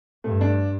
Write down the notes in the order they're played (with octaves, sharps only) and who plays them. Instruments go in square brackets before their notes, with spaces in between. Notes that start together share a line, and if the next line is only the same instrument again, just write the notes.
[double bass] G2 [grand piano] A3
[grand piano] D4